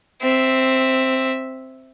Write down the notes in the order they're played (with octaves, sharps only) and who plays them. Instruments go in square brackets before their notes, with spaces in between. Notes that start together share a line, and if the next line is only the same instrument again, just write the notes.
[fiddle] C4 E5